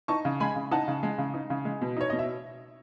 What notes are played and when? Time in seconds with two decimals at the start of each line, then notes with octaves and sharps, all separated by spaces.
0.08 D#4 A5 C#6
0.25 C#3
0.40 G#3 G#5 B5
0.56 C#3
0.71 D#4 F#5 A5
0.88 C#3
1.03 G#3
1.18 C#3
1.34 D#4
1.50 C#3
1.65 G#3
1.82 B2
1.97 D#4 C#5
2.10 B2 D#5
2.19 E5